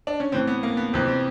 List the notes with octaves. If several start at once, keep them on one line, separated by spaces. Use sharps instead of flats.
D4
C#4
A2 E3 C4
B3
A#3
B3
F2 C3 E3 C4
C4